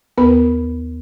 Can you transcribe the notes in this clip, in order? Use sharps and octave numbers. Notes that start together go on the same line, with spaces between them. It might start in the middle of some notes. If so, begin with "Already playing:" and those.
D#2 B3 A#4 B4 B5